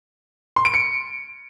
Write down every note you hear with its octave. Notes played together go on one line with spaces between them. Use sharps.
C6
D7
C#7